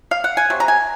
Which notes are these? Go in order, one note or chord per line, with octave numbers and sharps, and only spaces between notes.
F5
F#5
G#5
C3 F#3
A#5
G#5